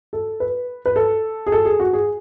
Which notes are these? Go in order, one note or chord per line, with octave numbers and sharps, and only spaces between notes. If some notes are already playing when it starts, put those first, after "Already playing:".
A4
B4
B4
A4
G#4
A4
G#4
F#4
G#4